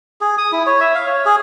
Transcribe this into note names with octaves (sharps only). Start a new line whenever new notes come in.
G#4
D#6
E4
C#5
E5
F5
C#5
G#4